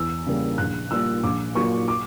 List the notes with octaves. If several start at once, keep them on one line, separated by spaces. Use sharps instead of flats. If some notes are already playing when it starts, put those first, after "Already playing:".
Already playing: E2 E6
C#3 G3 A#3
A#1 F#6
A#2 G3 A#3 E6
A#1 D6
A#2 F#3 A#3 C#6
D6